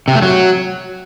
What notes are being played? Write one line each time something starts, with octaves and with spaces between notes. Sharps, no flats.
C3
A3
F#3